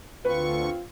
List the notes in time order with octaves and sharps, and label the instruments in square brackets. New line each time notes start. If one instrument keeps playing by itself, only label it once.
[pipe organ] D2 D3 C#6 [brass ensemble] C4 F4 [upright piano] B4